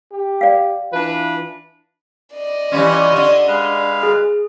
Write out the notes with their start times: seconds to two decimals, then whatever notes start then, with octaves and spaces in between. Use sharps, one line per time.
0.12 G4
0.41 D5 F5
0.93 E3 D4 F4 B4
2.34 D5 D#5
2.72 E3 G3 C#4 F4 C#5
3.12 D3 D4
3.48 G#3 B4 F5
4.03 G#4